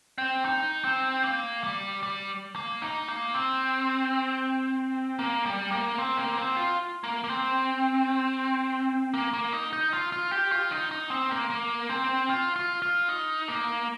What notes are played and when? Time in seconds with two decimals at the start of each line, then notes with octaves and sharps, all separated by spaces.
0.18 C4
0.45 D#4
0.84 C4
1.24 A#3
1.64 G3
2.03 G3
2.56 A#3
2.82 D#4
3.08 A#3
3.34 C4
5.19 A#3
5.46 G3
5.71 A#3
5.98 C4
6.17 A#3
6.38 C4
6.56 F4
7.04 A#3
7.24 A#3
7.30 C4
9.14 A#3
9.33 A#3
9.53 D#4
9.73 D#4
9.93 F4
10.12 F4
10.32 G4
10.52 F4
10.71 D#4
10.91 D#4
11.11 C4
11.31 A#3
11.50 A#3
11.90 C4
12.29 F4
12.56 F4
12.82 F4
13.09 D#4
13.48 A#3